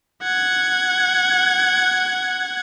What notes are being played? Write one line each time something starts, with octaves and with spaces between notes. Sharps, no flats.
F#5 G#6